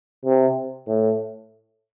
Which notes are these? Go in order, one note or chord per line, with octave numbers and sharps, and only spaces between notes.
C3
A2